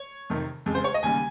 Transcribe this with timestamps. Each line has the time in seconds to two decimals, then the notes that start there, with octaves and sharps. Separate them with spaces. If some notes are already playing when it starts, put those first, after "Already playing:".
Already playing: C#5
0.30 F2 C3 D#3
0.66 F2 C#3 G#3
0.75 C5
0.84 C#5
0.94 D#5
1.03 D#2 C#3 G3 G#5